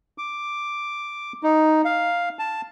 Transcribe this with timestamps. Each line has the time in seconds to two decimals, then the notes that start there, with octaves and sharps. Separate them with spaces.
0.18 D6
1.43 D#4
1.85 F5
2.39 A5